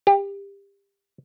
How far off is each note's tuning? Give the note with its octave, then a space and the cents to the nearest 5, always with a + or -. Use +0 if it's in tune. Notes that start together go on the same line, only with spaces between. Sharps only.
G4 +25